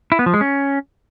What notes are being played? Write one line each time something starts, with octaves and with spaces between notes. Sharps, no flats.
E4
B3
F3
G#3
C#4